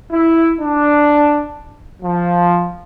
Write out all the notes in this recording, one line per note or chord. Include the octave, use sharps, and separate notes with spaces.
E4
D4
F3